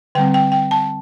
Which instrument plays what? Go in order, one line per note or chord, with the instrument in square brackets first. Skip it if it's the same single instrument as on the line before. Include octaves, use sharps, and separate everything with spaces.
[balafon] D3 G3 C4 G5
G5
G5
A5